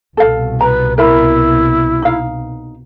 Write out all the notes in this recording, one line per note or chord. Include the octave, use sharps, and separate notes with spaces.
C2 B2 A4 F5
B4 A#5
E4 A#4 E5 B5
D#4 F5